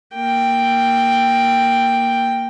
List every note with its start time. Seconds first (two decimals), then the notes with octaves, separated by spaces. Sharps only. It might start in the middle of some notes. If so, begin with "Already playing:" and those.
0.16 A#3 G5